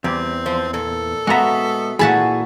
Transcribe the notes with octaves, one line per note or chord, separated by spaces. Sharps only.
E2 G3 C4
F3 C5
A#2 A4
G#3 B3 F#4 E5 A#5
A#2 E3 F#4 G#4 A5 B5